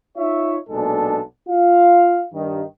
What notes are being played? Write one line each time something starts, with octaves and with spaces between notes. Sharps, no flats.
D#4 F4 C#5 E5
B1 A#2 G#3 D4 A4
F4 F5
G2 D#3